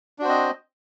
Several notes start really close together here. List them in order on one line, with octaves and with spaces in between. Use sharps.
D4 F#4 C5 C4 D#5